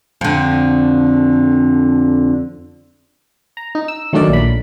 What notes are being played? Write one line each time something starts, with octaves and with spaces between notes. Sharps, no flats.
F2 D3
A#5
D#4
E6
D#3 F#3 A3 D4 A#4 D5
A#1 B5